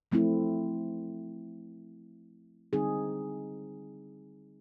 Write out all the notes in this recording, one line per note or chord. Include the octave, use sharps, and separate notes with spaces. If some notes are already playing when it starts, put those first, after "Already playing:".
F3 A3 C4 E4
D3 G3 C4 D#4 G#4